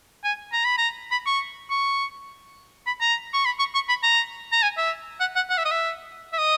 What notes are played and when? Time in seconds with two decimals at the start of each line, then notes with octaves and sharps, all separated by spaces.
0.24 G#5
0.53 A#5
0.65 B5
0.78 A#5
1.12 B5
1.26 C#6
1.70 C#6
2.87 B5
3.01 A#5
3.34 C#6
3.46 B5
3.59 C#6
3.74 C#6
3.89 B5
4.03 A#5
4.52 A#5
4.63 G#5
4.77 E5
5.20 F#5
5.36 F#5
5.50 F#5
5.58 E5
5.65 D#5
5.71 E5
6.33 E5
6.38 D#5